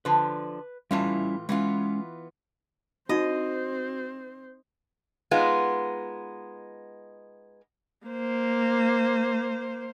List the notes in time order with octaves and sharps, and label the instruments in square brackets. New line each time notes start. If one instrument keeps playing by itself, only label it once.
[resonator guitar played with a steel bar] D3 F3 [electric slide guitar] B4
[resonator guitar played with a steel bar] A2 E3 F4 [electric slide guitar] G3 C#4 E4
[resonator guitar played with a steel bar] E3 B3 F4 [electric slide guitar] G#3 C#4
[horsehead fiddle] C4 C5 [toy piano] D4 D#4 [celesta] F#4 [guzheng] D#5
[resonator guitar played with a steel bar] G#3 B3 D#4 F4
[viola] A#3 C5